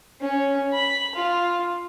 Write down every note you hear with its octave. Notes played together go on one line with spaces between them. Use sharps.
C#4
B5
F4